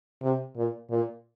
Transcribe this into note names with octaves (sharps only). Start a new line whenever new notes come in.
C3
A#2
A#2